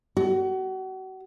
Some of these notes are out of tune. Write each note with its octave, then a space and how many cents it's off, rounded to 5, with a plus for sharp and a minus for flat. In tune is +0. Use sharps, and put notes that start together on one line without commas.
F#4 +35